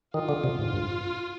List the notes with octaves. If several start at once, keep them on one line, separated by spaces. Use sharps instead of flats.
D#3 F4
D3
C3
G#2
G2